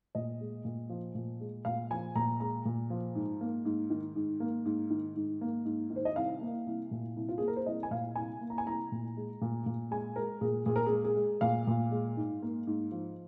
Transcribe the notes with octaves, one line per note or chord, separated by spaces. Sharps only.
A#2 D#5
G#3
A#2
F3
A#2
G#3
A#2 F5
F3 G#5
A#2 A#5
G#3 A#5
A#2
F3
G#2
A#3
G#2
D#3
G#2
A#3
G#2
D#3
G#2
A#3
G#2
D#3
C5
D#5
C2 F5
A#3
C2
A#2
C2
F4
A#3 G#4
A#4
C5
C2 D#5
G#5
A#2 F5
C2 G#5
A#3
A#5
G#5
C2 A#5
A#2
G#3
A#2
A#2
G#3 G#5
G#3 A#4
A#2 G#4
A#2 G#4
A#4
G#3 G#4
G#4
G#3
A#2 F5
A#2
G#3
G#2
A#3
G#2
F3